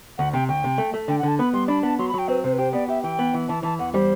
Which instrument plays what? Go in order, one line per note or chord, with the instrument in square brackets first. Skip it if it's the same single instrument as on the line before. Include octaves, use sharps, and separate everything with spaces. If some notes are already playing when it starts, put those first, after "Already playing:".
[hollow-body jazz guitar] D2 [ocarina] F#5
[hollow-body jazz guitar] C3 [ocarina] G5
[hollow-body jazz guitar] D2 [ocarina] G5
[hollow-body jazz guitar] C3
A3
A3
[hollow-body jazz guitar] D3 [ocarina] G5
[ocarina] F#5
[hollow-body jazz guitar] D3 [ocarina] A5
[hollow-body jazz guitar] B3 [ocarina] B5
[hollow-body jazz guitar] G3 [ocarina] C6
[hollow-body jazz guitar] D4 [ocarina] B5
[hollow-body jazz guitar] B3 [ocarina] A5
[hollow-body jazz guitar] F#3 [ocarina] C6
[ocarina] B5
[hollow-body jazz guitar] F#3 [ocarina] G5
[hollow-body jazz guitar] C4 [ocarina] B4
[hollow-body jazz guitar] C3 [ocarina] C5
[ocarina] B4
[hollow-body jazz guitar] G4 [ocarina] C5
[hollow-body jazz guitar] B3 [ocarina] D5
[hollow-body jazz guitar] G4 [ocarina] E5
[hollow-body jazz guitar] E3 [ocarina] G5
[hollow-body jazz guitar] B3
E3
[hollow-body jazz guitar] E3 [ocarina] A5
[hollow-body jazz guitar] E3 [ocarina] A5
[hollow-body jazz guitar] E2 [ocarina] F#5
[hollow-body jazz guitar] G3 [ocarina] C5